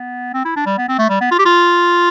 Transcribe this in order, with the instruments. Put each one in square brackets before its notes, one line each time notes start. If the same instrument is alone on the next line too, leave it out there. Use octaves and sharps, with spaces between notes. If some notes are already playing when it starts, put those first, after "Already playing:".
Already playing: [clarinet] B3
C4
E4
D4
G3
B3
C4
A3
G3
B3
F4
G4
F4